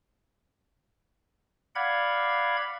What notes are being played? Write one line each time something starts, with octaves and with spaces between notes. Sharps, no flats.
D5 F5 F#5 B5 G#6